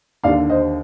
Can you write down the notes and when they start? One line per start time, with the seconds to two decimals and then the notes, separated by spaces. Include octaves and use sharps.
0.23 D#2 D3 D5 F5
0.50 C5 D#5